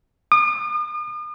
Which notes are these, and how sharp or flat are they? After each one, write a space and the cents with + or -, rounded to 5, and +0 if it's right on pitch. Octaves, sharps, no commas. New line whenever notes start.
D#6 -45